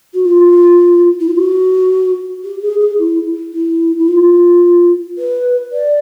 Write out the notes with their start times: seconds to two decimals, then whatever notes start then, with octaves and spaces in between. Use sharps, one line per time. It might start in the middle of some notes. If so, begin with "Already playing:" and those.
0.14 F#4
0.25 F4
1.20 E4
1.28 F4
1.35 F#4
2.44 G4
2.62 G#4
2.81 G#4
2.98 E4
3.53 E4
3.99 E4
4.08 F4
5.18 B4
5.72 D5